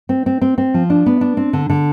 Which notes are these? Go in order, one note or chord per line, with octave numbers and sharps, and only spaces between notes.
C4
C4
C4
C4
F3
D4
B3
D4
C4
D3
D3